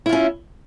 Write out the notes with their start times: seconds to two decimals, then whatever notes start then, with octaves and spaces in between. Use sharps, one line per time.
0.06 E4
0.09 F4
0.13 C#4